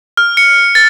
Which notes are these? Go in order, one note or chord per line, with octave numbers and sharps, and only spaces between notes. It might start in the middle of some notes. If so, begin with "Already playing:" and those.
F6
C#7
A6